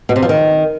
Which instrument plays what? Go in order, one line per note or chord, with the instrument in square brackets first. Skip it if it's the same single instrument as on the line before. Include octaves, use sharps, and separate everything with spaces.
[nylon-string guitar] B2
C3
F3
D#3